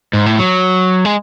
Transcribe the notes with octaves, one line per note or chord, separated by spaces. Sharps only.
G#2
A2
F#3
G#3